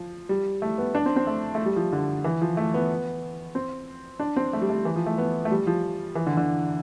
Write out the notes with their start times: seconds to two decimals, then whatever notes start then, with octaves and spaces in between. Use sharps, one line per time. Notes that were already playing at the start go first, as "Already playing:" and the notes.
Already playing: F3
0.29 G3
0.62 A3
0.78 B3
0.95 D4
1.06 C4
1.16 C4
1.27 A3
1.55 A3
1.66 G3
1.76 F3
1.93 D3
2.24 E3
2.41 F3
2.57 A3
2.74 B3
3.55 C4
4.19 D4
4.36 C4
4.53 A3
4.62 G3
4.70 A3
4.85 E3
4.96 F3
5.06 A3
5.18 B3
5.45 A3
5.51 G3
5.67 F3
6.15 E3
6.27 D3
6.37 D3